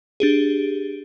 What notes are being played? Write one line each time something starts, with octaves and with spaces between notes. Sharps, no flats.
D4 G4 G#4